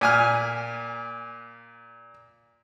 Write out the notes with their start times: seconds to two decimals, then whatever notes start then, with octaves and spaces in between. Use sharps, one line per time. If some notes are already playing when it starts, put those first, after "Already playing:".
0.01 A#2 G#5 F6